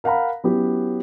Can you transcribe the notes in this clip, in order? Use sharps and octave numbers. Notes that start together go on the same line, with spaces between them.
A#4 F5 F#5 A#5 B5
F#3 B3 C#4 E4 G4